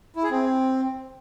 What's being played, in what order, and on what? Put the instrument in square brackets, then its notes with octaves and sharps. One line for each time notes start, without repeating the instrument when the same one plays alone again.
[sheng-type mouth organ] E4
G#4
C4